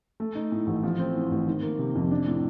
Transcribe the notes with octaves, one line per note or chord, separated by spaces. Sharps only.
A3
D#4
A2
A1
F3
C4
A2
A1
D#3
A#3
C3
F2
D4
A2